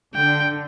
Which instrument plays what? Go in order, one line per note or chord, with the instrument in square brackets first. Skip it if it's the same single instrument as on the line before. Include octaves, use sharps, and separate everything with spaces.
[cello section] D3 [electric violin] G5